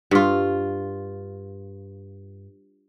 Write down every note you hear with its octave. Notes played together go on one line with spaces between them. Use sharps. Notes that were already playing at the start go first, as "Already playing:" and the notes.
G2 F4